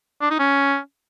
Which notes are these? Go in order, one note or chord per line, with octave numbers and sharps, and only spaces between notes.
D4
D#4
C#4